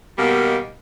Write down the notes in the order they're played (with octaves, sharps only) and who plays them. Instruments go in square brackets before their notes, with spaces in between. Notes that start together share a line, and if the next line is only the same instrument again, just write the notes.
[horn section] B2 D#3 G3 A#3